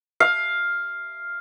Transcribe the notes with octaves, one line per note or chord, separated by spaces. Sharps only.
F5